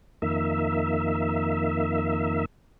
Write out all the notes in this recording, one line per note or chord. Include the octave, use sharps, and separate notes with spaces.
F2 D#3 A#3 E5